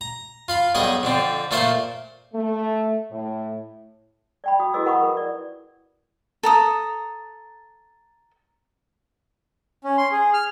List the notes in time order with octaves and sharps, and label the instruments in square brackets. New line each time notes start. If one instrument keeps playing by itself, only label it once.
[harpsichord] A#5
F4 F5 B5
B1 G2 G#4 D#5
F2 D3 C4
A#2 A3 A4 C5 F5 C6
[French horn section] A3
A2
[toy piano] D5 G5 B5
F#4 D#6
E4 F#4 G#4 B4 D#5 E6
A#4 F#5 B5 C#6 D#6
A#4 B4
D5
[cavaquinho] A4 A#5 D#6
[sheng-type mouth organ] C#4
C6
G#4
F6